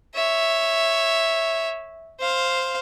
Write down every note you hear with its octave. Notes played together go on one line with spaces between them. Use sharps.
C#5 E5
C5 F5